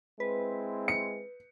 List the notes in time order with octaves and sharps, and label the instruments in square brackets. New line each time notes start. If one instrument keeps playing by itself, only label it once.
[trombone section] G#3 C4 E4 [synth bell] B4
[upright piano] C#7